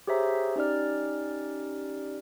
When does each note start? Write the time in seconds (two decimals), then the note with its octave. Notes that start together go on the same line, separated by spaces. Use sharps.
0.07 G4 G#4 C5 C#5 E5 A#5
0.56 C#4 D#4 G4 D5 F6